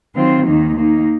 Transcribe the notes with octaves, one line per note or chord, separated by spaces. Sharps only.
D#3 F#3 C4 F4
D#2 D#3 A#3 D#4
D#3 A#3 D#4